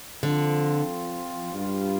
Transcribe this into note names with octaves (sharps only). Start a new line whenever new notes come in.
D3 F3 C4 F4
G2 G3 F4